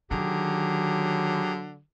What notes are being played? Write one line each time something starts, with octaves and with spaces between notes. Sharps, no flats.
D3 D#3 F#3 G4 G#4 A#5